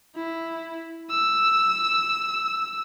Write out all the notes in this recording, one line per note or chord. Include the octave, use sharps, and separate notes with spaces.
E4
E6